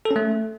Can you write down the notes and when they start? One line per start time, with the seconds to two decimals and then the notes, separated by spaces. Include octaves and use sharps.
0.05 A4
0.11 C#4
0.16 A3